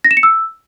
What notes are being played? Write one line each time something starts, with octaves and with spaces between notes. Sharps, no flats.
A#6
E7
C#7
E6